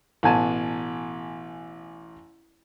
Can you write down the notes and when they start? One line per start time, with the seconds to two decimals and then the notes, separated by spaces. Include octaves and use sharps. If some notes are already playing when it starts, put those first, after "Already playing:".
0.23 A1 B2 G#5 A5